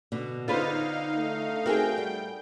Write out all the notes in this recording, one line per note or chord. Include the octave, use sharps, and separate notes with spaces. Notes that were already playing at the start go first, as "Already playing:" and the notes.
B2 D3
D3 D#4 F4 B4 C5 F5
A3
C4 F#4 G#4 A#4 G5
G3